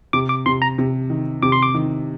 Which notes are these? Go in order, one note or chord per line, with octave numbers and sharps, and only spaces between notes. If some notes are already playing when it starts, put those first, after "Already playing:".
C3 D6
D6
C3 C6
A#5
C3
D#3
C3 D6
C6
D6
D#3